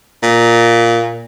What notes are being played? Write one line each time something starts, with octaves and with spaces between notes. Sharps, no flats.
A#2